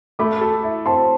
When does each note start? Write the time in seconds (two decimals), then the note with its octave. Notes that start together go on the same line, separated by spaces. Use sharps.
0.19 A3 B5 D6
0.41 A4
0.63 E4
0.86 C4 A5 C6